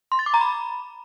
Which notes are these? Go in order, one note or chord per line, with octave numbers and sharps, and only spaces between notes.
C6
A6
D6
A#5
B5